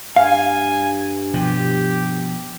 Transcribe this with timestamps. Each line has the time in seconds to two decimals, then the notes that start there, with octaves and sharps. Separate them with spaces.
0.16 G2 F5 G#5
1.34 B2 F3 G4